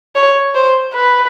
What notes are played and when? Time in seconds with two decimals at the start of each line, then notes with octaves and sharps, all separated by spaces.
0.15 C#5
0.55 C5
0.94 B4